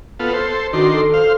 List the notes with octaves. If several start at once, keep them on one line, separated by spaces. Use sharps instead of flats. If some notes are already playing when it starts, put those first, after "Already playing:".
B3 F4 A4
A4 C5
D#3 D4 F#4 C6
A4
C5 F5